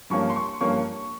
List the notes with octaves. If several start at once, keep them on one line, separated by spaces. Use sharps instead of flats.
G2 F3 A#3 C#4 C#6
C6
C#6
G2 F3 A#3 C#4 C#6